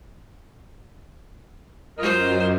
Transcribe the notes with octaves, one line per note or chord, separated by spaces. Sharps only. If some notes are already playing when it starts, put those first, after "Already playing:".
F#2 F4 A#4 C5 D#5